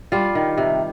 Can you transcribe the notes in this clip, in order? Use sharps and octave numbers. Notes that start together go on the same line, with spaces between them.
G3 F4
D#3
C3